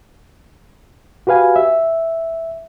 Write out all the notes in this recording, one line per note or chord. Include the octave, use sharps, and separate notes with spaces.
F#4 G4 B4 F5 G#5
E5